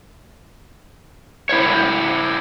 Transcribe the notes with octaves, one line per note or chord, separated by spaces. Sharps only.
E4 C5 C#5